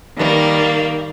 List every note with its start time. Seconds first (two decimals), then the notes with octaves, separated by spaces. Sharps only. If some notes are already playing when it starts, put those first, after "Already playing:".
0.18 D#3 G3 A#3